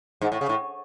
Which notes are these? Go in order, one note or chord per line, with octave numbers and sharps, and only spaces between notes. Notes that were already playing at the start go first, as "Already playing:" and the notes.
G#2
A2
C#3
A2